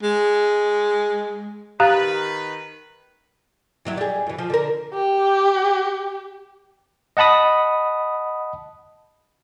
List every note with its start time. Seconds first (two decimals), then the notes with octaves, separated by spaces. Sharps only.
0.03 G#3
1.80 D#3 G4 B4 F5 A#5 D#6 F#6 A6
3.85 G2 F#3 E4
3.97 G3 G#4
4.27 F#2 E3
4.38 F3
4.50 D3 A#4
4.94 G4
7.17 D#5 F#5 A5 B5 D#6